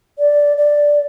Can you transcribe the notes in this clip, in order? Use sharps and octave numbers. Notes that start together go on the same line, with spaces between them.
D5
D5